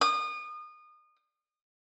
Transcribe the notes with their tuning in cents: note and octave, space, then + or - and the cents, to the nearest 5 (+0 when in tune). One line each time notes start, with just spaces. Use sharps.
D#6 -30